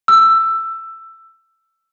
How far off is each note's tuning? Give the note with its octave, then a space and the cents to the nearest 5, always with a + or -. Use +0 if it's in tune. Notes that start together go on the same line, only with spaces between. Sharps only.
E6 +10